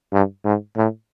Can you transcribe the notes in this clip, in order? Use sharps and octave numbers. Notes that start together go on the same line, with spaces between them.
G2
G#2
A2